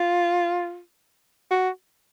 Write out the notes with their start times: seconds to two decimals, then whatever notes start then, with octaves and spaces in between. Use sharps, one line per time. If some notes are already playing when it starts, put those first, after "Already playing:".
Already playing: F4
1.51 F#4